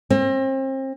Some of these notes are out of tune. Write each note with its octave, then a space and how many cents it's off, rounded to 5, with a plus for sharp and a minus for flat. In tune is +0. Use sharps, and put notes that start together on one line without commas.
C4 +35